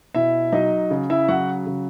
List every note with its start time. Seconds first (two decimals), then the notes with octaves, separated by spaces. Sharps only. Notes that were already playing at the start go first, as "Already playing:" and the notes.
0.15 B2 E4 E5
0.52 F#3 D#4 D#5
0.91 C#3
1.10 E4 E5
1.28 F#3 F#4 F#5
1.67 C#3